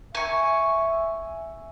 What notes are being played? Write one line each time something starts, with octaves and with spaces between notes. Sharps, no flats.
E5 G#5 C#6